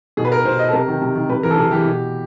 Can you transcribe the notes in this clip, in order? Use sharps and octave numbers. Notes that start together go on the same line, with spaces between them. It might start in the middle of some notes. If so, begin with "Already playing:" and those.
B2 G#4
B4
A#4
B2 C5
D#5
A4
C3 A#4
D#3
C3
D#3
C3 B4
E3 A#4
A4
C3 G#4
E3 G4
B2